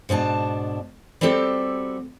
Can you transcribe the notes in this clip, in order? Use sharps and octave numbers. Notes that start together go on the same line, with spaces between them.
G#2 B2 D4 A5
G3 C4 F#4 G4 A4